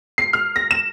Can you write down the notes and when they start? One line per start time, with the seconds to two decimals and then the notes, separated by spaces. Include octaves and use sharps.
0.18 C7
0.33 F6
0.56 A#6
0.71 E7